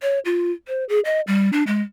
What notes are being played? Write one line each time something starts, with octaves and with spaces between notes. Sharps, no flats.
C#5
F4
C5
G#4
D#5
G3
D4
G#3